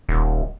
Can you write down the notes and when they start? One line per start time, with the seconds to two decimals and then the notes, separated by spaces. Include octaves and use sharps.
0.09 D#1